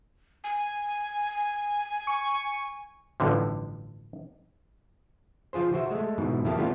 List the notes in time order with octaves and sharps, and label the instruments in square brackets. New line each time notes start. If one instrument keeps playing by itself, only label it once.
[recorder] G#5
[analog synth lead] C#6
[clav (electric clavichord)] A1 G2 D3 F3
F3 F4 G#4 C5
F#4 C5 E5
G#3 A3
G#2 B2 E3
F2 A#3 E4 G4 F5 A5
G3 A3 B3 C#4 F4 G4